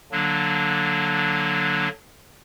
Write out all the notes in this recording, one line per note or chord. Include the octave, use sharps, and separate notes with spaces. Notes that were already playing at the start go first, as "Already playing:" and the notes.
D3 F#3 A#3 D4